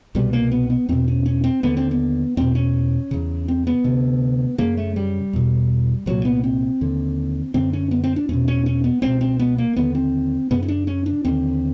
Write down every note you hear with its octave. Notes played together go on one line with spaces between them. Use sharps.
C2 B2 G3
A#3
B3
B3
E2 B2 C4
C#4
C#4
C4
D#2 D3 B3
C4
B3
E2 B2 C4
C#4
E2 C#3
C4
B3
D2 C3
F#2 C#3 A#3
A3
G3
E2 B2
C2 A#2 F#3
B3
C4
D#2 D3
F#2 D3 C4
C#4
B3
C4
D4
E2 B2 C#4
C#4
C#4
B3
C#2 B2 C4
C4
B3
A#3
D#2 D3 B3
C4
F#2 C#3 B3
C#4
D4
C#4
D4
D#2 D3 C4